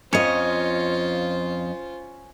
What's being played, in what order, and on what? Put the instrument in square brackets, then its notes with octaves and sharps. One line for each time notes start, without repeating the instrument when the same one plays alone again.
[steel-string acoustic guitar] F2 D#5 [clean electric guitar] C#4 C#5 [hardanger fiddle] F4 C5